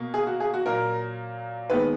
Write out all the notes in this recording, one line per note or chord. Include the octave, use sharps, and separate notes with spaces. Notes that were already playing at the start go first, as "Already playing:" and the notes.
Already playing: B2 A#3
G#4
F#4
G#4
F#4
A#2 F#3 A#3 A#4
D#2 D#3 G#3 B3 B4